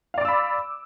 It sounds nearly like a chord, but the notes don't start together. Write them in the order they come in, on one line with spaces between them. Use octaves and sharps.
F5 D5 D6 E6 B5